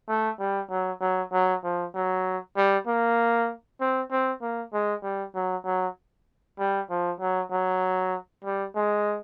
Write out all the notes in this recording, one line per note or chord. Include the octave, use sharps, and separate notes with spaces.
A3
G3
F#3
F#3
F#3
F3
F#3
G3
A#3
C4
C4
A#3
G#3
G3
F#3
F#3
G3
F3
F#3
F#3
G3
G#3